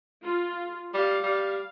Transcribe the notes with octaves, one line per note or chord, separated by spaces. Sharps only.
F4
G3 F5
G3